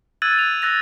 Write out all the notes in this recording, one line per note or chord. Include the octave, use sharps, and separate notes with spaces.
E6 F#6 G#6 A6 D#7 F#7
F7
E6 F#6 A6 A#6 F7